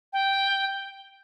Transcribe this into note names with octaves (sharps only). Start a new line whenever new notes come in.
G5